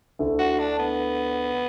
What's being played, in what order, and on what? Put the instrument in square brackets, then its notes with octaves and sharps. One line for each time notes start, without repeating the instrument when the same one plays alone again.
[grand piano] D2 D3 A3 E4
[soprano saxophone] F#4
D4
B3